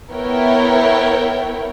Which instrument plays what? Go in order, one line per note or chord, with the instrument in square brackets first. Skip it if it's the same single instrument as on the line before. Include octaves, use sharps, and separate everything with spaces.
[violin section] B3 E4 A#4 C#5 G5